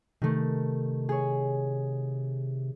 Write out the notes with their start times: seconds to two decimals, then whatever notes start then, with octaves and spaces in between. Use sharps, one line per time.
0.22 C3 D#3 A3
1.09 G#4 C#5